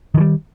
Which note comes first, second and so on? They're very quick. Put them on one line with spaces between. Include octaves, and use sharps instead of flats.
D#3 E3 G3